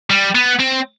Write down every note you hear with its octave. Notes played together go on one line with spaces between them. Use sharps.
G3
B3
C4